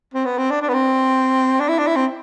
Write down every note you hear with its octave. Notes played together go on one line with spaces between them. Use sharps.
C4
B3
C4
D4
D4
B3
C4
D4
E4
D4
E4
C4